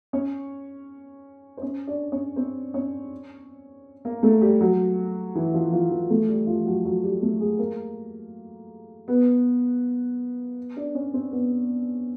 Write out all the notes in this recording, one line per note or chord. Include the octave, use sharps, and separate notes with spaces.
C#4 C#5
C5
C#4 C#5
D4 D5
C#4 C#5
C4 C5
C#4 C#5
A#3 A#4
A3 A4
G3 G4
F#3 F#4
E3 E4
F3 F4
F3 F4
E3 E4
A3 A4
G3 G4
F3 F4
F#3 F#4
F#3 F#4
G3 G4
A3 A4
G#3 G#4
A#3 A#4
B3 B4
D4 D5
C#4 C#5
C4 C5
B3 B4